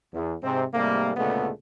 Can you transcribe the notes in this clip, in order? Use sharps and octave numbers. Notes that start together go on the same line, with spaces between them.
E2
G#2 C3 C4
G#2 C3 G3 A3 A#3
D2 A#2 C#3 G#3 A3 B3